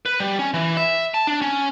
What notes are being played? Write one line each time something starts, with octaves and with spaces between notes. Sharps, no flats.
B4
G3
C#4
E3
E5
A5
D4
C#4